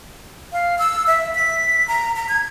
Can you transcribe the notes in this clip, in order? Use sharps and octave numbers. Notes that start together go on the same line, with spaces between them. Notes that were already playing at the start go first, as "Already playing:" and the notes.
F5
E6
E5
B6
A#5
A#5
G#6